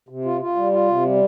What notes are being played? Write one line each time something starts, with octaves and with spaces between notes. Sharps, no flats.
C3
F4
F4
G3
F4
C3
G3